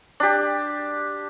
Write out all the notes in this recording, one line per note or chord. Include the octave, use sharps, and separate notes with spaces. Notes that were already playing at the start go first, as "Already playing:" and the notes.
D4 G4